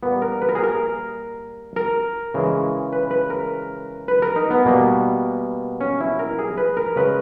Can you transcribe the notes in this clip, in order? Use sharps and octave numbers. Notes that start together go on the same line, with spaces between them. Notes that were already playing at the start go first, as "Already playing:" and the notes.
A#2 G3 A#3 B3
A#4
B4
A#4
G#4
A#4
A#4
C#3 E3 G#3
B4
B4
A#4
B4
A#4
D#4
B3
B2 G3 A#3
C#4
E4
A#4
G#4
B4
A#4
C#3 G#3 B4